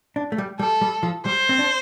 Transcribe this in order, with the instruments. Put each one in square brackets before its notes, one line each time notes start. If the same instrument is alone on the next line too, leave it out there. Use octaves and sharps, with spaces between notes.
[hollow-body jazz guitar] D4
A3
G3
[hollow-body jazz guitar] G3 [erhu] A4
[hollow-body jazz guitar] G3
F3
[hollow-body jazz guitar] G3 [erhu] C5
[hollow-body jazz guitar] C4
D4